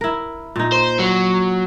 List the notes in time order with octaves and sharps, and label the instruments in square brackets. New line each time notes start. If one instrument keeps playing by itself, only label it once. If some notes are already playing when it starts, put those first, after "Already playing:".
[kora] E4 A#4
A#2 D#4
[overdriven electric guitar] C5
F#3